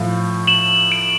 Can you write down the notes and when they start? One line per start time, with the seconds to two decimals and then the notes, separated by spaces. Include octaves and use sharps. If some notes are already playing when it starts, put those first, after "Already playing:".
Already playing: A2 F3
0.47 E7 F#7
0.92 D7 E7